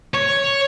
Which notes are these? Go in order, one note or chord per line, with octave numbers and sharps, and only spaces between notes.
C#5